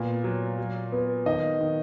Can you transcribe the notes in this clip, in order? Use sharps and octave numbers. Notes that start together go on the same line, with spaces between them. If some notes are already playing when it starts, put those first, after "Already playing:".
Already playing: A#2 B3
F#3
F#3
B3
D#3 D#5
D#3